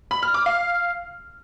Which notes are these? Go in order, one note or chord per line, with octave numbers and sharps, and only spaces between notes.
B5
F6
D6
F5